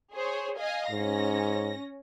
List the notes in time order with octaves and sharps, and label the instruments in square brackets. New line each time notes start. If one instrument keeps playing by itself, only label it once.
[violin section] G#4 C5 C#5
D#5 F5 G#5
[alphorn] G#2 [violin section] C#4 A#6